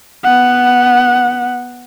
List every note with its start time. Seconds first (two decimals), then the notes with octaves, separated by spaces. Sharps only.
0.24 B3 F#5